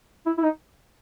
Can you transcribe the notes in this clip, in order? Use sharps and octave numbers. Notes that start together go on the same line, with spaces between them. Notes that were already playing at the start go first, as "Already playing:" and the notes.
E4
E4
D#4